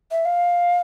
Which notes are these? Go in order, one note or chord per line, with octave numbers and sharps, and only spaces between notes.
E5
F5